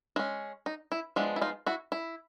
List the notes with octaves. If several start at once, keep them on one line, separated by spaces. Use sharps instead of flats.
G#3 C#4 E4
D#4
E4
F3 G#3 B3 D4 E4
E4
D#4 F4
E4 F#4
E4